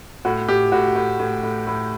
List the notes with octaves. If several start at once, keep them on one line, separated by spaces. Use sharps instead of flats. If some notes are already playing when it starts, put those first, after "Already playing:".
A2 F#4
A2 G4
A2 F#4
A2
A2
A2
A2